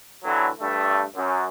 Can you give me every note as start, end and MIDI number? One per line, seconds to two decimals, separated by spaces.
0.24 0.48 45
0.24 0.48 50
0.24 0.48 52
0.24 0.48 54
0.61 1.02 43
0.61 1.02 57
1.15 1.45 42